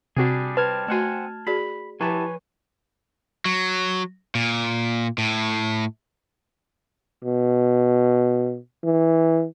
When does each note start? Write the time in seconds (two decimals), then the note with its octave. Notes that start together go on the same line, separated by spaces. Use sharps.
0.17 C3 G3 C4 D4 F#4 G#4
0.57 G3 C4 B4 A5 F6 G#6
0.88 A3 C4 F#4 F#5 G#5
1.47 F#4 G#4 D5 B5
2.01 F3 E4 G4 B4 C#5 G#5 A5
3.45 F#3
4.35 A#2
5.18 A2
7.24 B2
8.84 E3